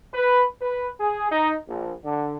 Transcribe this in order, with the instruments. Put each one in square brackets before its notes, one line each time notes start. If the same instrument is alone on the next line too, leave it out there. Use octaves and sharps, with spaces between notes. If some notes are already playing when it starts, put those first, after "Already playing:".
[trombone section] B4
B4
G#4
D#4
A#1
D3